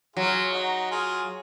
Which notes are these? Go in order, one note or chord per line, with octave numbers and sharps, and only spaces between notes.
F#3 F4 G#4
D#4 F#4
F4 G#4